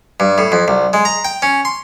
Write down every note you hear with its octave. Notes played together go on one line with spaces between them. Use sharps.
G2
A2
F2
C2
G#3
A#5
G5
C#4
C6